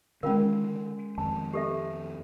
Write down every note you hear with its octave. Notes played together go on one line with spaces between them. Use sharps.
D3 D#3 G#3 C#4 F4 A#4 F5
F2 D#3 C4 A5
G4 A4 E5